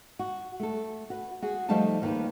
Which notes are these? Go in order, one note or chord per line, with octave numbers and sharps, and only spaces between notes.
F#4
A3 A4
F#4 B4
F#4 G#4
F3 G3 A3 D#4 F5 A5
D#2 D#3 F3 A4 B4